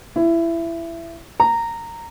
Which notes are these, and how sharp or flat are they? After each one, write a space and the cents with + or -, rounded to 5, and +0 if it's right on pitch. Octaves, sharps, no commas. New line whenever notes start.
E4 +20
A#5 -15